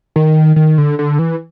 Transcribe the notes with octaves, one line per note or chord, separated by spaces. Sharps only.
D#3
D#3
D3
D3
E3